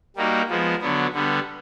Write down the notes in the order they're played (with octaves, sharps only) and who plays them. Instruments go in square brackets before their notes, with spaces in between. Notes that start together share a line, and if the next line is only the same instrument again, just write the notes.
[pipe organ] G3 A#3 D#4 F#4
F3 G#3 B3
D3 F#3 B3
D3 G3 B3